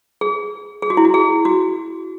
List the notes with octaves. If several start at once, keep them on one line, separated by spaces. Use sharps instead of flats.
G#4
G#4
F#4
E4
F#4
G#4
F#4